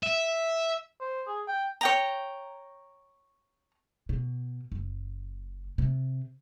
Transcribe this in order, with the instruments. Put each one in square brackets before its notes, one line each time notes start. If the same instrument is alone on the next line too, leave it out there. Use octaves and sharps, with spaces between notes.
[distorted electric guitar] E5
[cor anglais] C5
G#4
G5
[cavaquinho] C#5 G5 A#5
[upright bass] B2
F#1
C3